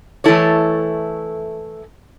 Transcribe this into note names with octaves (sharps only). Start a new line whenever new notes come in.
E3 A3 E4 A4 C#5